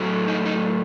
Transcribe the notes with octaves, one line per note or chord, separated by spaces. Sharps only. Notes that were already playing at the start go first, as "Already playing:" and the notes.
Already playing: A2 F#3 A3
D#4
D#4